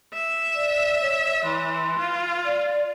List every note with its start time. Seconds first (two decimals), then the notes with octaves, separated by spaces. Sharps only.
0.14 E5
0.55 D5
1.01 C#5
1.44 E3 C6
1.98 F4
2.45 D5